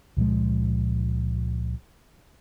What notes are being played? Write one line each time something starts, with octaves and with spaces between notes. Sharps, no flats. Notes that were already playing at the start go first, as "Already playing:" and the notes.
C#2 A#2 F3 G#3